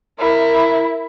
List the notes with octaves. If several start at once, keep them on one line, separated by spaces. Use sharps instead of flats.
E4 A#4